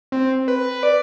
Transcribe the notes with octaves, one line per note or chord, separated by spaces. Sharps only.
C4
B4
D5